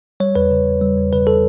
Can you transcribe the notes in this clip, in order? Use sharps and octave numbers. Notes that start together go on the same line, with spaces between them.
G3 C#5
E2 B4
C#3
E2
G3
E2
C#3 B4
A4